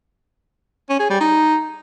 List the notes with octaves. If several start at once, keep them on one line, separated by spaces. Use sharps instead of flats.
C#4
G#4
G3
D#4